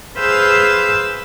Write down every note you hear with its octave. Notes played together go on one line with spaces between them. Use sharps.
G#4 B4 C5 F5 E6 G6